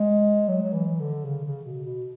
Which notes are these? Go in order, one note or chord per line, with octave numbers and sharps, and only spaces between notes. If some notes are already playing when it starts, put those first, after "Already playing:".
Already playing: G#3
F#3
F#3
E3
D3
C#3
C#3
B2
B2